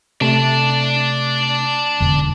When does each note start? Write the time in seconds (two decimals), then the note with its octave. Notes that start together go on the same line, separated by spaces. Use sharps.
0.21 C3 A3 D5 A5
2.00 E1 E2 D3